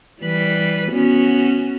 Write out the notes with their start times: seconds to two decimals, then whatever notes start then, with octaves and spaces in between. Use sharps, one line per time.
0.21 E3 G3 B4
0.91 B3 C#4 F#4